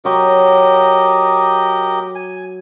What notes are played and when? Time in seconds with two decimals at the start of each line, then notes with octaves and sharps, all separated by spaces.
0.05 F#3 G4 A#4 D#5 C#6
2.15 G#5